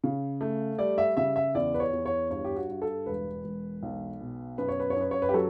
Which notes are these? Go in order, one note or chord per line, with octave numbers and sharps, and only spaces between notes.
C#3
A3
G3 D5
E5
C#3 E5
E5
E2 D5
B4
C#5
E2
C#5
G2 C#5
G4
F#4
G2
A4
E1 B4
E1
B1
B2
F#2 B4
C#5
B4
C#5
F#2 B4
C#5
B4
G4
F#3 A4